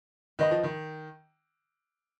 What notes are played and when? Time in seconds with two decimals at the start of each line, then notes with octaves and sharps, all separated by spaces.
0.39 D#3 B4 D#5 B5
0.51 F3
0.63 D#3